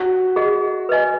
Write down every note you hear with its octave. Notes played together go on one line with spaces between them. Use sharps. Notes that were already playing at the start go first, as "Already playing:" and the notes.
Already playing: F#4
G#4 D#5 F#5
B4 D#5 G#5